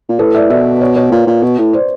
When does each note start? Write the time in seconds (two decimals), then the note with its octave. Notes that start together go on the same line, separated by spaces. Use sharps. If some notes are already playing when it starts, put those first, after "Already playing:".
0.09 A#2
0.19 A2 A4 B4
0.34 D5 E5
0.50 B2 D5 E5
0.81 C#5 D#5
0.96 B4 C#5
1.12 A#2
1.27 A#2
1.43 B2
1.58 A2
1.73 C5 D5